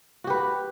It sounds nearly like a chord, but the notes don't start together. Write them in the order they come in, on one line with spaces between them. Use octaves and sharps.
F#4 G4 B4